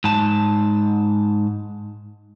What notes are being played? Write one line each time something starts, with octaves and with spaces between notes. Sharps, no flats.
G#2 A5